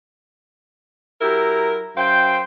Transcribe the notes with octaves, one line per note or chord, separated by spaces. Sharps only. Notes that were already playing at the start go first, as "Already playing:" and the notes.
F#3 E4 G4 A#4 A#5
F#2 C5 F5 G5